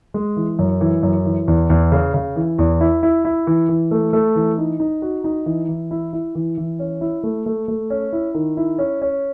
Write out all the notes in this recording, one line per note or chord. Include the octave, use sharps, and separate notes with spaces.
G#3
E3
F#2
E3
F#2
E3
E2
E2
C#3
C#3
E3
E2
E4
E4
E4
E3
E3
A3
A3
E3
D#4
D#4
F#4
D#4
E3
E3
E4
E4
E3
E3
C#4
E4
A3
A3
A3
C#4
E4
D#3
E4
C#4
C#4